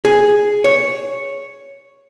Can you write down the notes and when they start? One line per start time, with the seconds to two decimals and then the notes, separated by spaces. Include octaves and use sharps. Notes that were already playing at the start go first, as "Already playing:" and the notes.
0.05 G#4
0.64 C#5